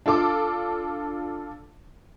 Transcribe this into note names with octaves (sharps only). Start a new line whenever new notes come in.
D4 F4 A4 D6